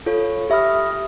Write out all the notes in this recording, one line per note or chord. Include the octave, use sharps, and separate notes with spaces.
F4 A4 C#5
G4 E5 B5 D#6 F6